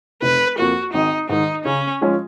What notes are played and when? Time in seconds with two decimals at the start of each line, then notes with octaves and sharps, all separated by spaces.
0.22 F1 B4
0.58 F2 F3 A#3 F#4
0.93 G#1 D#4
1.29 G#2 D#3 D#4
1.65 C#3 C#4
2.01 F3 G#3 C#4 F4